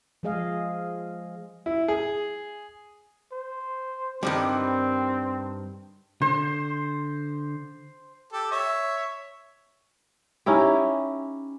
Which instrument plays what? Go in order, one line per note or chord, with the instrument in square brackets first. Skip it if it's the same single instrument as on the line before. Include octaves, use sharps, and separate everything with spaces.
[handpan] F3 G#3 G#4 D#5 F5
[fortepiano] E4
G#4
[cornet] C5
[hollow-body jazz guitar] G2 D#3 G3 [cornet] C4
[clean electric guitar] D3 [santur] C5
[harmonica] G4 A4
C#5 E5
[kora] C#4 D#4 E4 G4